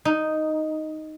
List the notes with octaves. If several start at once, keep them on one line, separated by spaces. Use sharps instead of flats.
D#4